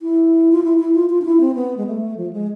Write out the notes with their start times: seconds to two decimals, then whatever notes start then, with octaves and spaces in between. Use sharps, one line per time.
0.02 E4
0.52 F4
0.64 E4
0.79 E4
0.95 F4
1.10 F4
1.21 D4
1.25 E4
1.41 C4
1.55 B3
1.77 G#3
1.87 A3
2.17 F3
2.33 G#3